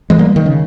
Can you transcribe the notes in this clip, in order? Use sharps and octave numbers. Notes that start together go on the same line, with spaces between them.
E3 G#3
G3 A#3
D#3
C#3